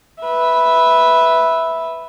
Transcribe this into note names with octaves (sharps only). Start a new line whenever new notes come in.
B4 E5